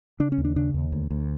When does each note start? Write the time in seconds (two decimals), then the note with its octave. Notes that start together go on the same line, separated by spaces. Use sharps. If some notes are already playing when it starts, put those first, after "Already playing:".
0.20 C#3 D4
0.32 C#4
0.38 D#2
0.45 D4
0.56 C#3 D4
0.74 D#2
0.92 D2
1.10 D2